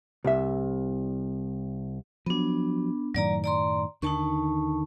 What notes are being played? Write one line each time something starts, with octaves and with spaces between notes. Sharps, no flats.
C2 E5
F3 F#3 B3 D4
F#2 A2 D#3 F#3 D5 A#5
D5 A#5 C6
D#2 D3 D#3 D#4 A5 C#6